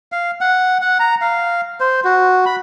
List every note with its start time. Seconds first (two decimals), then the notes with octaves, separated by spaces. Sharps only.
0.12 F5
0.41 F#5
0.82 F#5
1.00 A#5
1.21 F5
1.80 C5
2.05 F#4
2.46 B5